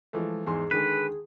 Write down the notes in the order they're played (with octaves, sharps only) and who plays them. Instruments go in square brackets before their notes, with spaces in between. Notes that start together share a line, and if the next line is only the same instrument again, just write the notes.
[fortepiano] E3 F3 A3 [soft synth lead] G#3
[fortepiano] E2 G#2 C6 [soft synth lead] G#4
[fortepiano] D3 D#3 G#3 [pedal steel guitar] B4